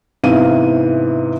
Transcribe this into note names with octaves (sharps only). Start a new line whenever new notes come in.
G#2 C3 E3 B3 F5 D#7